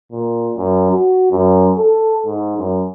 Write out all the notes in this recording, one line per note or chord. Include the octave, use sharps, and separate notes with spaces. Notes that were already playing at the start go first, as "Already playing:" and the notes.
A#2
F#2
F#4
F#2
A4
G#2
F#2